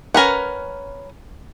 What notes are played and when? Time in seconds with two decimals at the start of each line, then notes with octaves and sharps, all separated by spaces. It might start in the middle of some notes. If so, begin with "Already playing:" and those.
0.14 C#4 A#4 B4 F#5